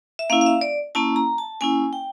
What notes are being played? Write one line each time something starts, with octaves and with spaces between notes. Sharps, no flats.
E5
A#3 C#4 E4 F5
F5
E5
D5
A#3 C#4 E4 A5
A#5
A5
A#3 C#4 E4 G#5
G5